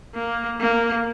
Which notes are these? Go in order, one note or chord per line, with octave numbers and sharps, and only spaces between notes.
A#3
A#3